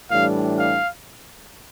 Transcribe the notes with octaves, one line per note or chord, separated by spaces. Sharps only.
A2 E3 G3 D4 F5
F5